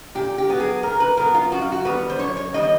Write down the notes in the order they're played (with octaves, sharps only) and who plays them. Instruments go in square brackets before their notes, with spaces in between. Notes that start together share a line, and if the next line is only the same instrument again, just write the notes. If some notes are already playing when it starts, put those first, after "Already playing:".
[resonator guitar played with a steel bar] A#2 G4
G4
F#3 B3
G#4
A#2 A#4
B4
F#3 B3 A#4
F4
F#2 F#4
F4
F#4
D#3 G3 B3 B4
C5
F#2 C#5
C#5
D#3 G3 B3 D#5